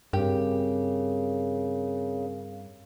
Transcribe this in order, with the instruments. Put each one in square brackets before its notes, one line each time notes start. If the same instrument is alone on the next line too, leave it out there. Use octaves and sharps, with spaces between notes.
[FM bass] G2 [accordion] C#3 [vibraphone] C4 A#4 [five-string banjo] G4